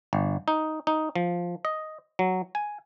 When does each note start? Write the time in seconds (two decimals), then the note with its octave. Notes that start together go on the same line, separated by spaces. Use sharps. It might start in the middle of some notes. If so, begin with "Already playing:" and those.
0.13 G1
0.48 D#4
0.87 D#4
1.16 F3
1.65 D#5
2.19 F#3
2.55 G#5